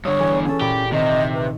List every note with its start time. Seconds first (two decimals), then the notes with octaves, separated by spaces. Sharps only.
0.05 G2 D3 C#5 C#6 D#6 E6
0.20 E3 G#4 G#5
0.45 C#4 G#4 A4
0.61 A#2 G4 D5 B5
0.92 C3 D#3 D#5 C#6 E7
1.34 B4